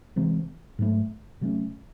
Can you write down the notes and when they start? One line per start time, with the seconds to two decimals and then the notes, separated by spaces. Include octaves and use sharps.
0.16 C3 E3 G#3 C4
0.79 G#2 F#3 A3
1.41 C3 F#3 A3 C#4